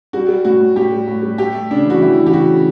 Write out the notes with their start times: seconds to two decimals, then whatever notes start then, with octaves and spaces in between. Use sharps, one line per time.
0.13 G3 F#4
0.29 G3
0.45 A2 F#4
0.61 A2
0.76 A2 G4
0.92 G3
1.07 A2
1.23 G3
1.38 A3 G4
1.55 A3
1.71 C#3 D4
1.86 E3 F#4
2.02 E3 E4
2.17 E3
2.26 G4
2.33 C#3 F#4
2.49 C#3